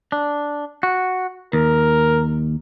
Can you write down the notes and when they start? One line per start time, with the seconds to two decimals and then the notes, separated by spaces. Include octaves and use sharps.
0.12 D4
0.83 F#4
1.53 D#2 A#4